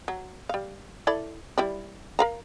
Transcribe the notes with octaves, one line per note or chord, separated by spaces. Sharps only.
F#3
G3 F5
E4 A4 D5
G3 E4 D5
A#4 F5 A#5